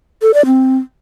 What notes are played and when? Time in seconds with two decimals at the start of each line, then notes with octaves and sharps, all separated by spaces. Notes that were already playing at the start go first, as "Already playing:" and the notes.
0.22 A4
0.34 D5
0.46 C4